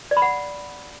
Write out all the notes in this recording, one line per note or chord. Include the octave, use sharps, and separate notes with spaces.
D5
B5
F#5